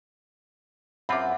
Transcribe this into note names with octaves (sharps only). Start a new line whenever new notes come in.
F#2 C4 F4 E5 F#5 B5 D6